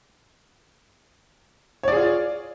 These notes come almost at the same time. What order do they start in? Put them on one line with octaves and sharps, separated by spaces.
C#5 D5 G#4 F4